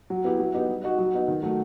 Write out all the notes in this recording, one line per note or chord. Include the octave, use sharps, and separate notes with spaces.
F#3
B3 E4 G4
F#3
B3 D#4 G4
G3
D#4 F#4
F#3
B3 D#4
D#3
F#3 A3